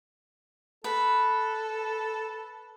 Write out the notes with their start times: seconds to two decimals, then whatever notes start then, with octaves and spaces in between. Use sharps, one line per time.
0.84 A4 B4